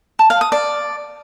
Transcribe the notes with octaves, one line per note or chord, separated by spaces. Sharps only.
A5
F5
D#6
D5